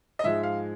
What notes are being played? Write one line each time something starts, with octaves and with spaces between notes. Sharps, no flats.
D#5
G#2 F3 G#3 E5
F5